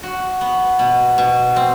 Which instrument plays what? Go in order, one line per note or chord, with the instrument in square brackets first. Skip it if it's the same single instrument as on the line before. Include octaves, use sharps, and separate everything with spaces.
[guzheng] F#4
B3
B2
B2
C4